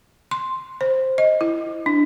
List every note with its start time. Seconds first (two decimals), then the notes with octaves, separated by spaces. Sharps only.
0.31 C6
0.81 C5
1.18 D#5
1.41 E4
1.86 D4